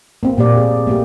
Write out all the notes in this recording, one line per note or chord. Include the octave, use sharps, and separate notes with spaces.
A#3 C4
A#2 A#3 G4 D5
G#4
A3 A#3 G4